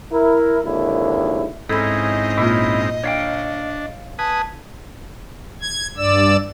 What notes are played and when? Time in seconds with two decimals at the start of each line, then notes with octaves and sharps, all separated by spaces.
0.12 E4 A#4
0.64 G#1 D#2 D3 E4
1.69 G#2 C4 C#4 D#4 E4 A4 D#5 B5
2.37 A#2 A#3 C#4 E4 F4
3.04 D4 C#5 F5 G5
4.19 B4 G#5 A5 D#6
5.61 G#6
5.97 G2 D5 E6